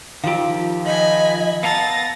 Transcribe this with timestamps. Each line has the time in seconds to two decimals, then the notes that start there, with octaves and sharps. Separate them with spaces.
0.24 D#3 F3 F4 G4 F5
0.86 D#5 G#5 B5
1.63 B3 F5 A5 A#5 A6 A#6